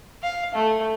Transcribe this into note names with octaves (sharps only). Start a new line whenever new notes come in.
F5
A3